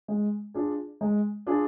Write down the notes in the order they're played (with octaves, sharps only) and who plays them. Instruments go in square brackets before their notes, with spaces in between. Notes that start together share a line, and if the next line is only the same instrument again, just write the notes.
[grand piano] G#3
D4 F4 G#4
G#3
D4 F4 G#4